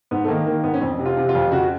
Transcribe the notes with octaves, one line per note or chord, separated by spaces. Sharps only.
G#2 B3
A3
D#3 A#3
D#3 A#3
G#2 B3
C#4
F2 C4
C3
F4
C3
F4
F2
C#3 F#4